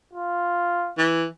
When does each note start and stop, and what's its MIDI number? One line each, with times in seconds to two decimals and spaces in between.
0.13 0.91 65
0.98 1.26 52